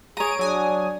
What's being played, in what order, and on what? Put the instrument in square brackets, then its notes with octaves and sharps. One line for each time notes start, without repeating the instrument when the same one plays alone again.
[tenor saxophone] G#4 [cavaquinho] C#5 A#5 [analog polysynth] D7 D#7
[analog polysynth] F#3 G#5 D#6 [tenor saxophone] D4